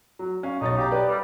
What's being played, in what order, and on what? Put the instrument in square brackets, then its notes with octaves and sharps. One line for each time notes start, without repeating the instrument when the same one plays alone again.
[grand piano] F#3
C#4 F5
[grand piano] B1 C#5 A6 [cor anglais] D#4
[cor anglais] G4 [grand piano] F5 A#5
[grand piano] B4 D5
[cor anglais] G3